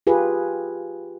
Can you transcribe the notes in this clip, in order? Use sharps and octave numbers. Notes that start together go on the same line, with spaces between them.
F4 G4 G#4 B4